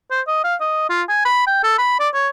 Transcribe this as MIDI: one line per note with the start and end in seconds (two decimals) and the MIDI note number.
0.11 0.21 72
0.27 0.43 75
0.44 0.55 77
0.61 0.87 75
0.89 1.02 65
1.09 1.22 80
1.25 1.43 83
1.47 1.63 79
1.64 1.73 69
1.78 1.99 83
1.99 2.09 74
2.14 2.28 73